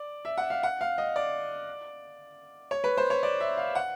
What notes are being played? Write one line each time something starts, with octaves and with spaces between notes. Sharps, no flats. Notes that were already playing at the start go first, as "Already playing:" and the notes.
Already playing: D5
E5
F#5
F5
F#5
F5
D#5
D5
C#5
B4
C5
C#5
D5
E5
F5
F#5